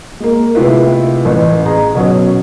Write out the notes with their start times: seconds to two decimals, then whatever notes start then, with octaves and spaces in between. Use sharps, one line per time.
0.20 G#3 A#3
0.55 C3 G#3 A3 E4 F4 B4
1.25 A1
1.66 G#4 A#5
1.95 B2 F#3 C#4